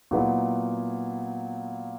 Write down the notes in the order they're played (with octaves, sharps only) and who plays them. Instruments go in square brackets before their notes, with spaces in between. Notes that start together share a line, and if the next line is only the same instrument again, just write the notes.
[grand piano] A#2 F#3 B3 E4